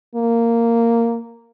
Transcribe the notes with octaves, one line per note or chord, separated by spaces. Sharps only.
A#3